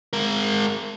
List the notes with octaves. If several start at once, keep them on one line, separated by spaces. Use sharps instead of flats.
G#3 A#4